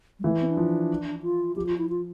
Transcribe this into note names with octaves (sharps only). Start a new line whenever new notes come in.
G3
E3 A3
C4
D4
F3
F4
F3 G4
F4
E4
F4